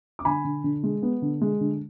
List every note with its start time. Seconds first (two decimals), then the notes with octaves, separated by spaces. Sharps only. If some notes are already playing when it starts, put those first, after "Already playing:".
0.19 D6
0.25 D3 G#5 B5
0.44 D3
0.64 D3
0.84 G#3
1.03 B3
1.22 D3
1.41 G#3
1.61 D3